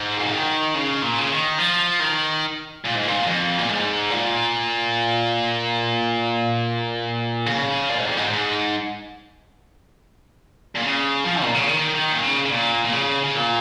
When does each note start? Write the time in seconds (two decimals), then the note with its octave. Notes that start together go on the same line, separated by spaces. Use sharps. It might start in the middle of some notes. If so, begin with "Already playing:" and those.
Already playing: G#2
0.18 A#2
0.25 C#3
0.32 D#3
0.74 C#3
1.02 A#2
1.18 C#3
1.31 D#3
1.59 F3
2.01 D#3
2.84 A#2
2.95 G#2
3.07 A#2
3.27 F2
3.58 A#2
3.69 G#2
4.10 A#2
7.46 C#3
7.89 A#2
7.98 G#2
8.07 F2
8.17 G#2
8.30 G#2
10.76 A#2
10.82 C#3
11.25 F3
11.43 A#2
11.55 C#3
11.67 D#3
11.95 D#3
12.12 A#2
12.23 C#3
12.45 C#3
12.51 A#2
12.85 A#2
12.92 C#3
13.24 C#3
13.36 A#2